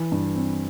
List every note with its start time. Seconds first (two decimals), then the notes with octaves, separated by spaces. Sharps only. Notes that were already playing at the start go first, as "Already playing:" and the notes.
Already playing: E3
0.12 G2
0.35 C4